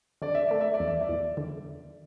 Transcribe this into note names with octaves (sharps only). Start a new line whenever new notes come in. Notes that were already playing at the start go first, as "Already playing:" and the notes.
D3 D5
E5
A3 D5
E5
D5
E2
E5
D5
E2
D3